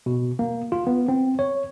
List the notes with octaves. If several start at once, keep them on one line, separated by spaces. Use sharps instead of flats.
B2
A#3
F4
B3
C4
C#5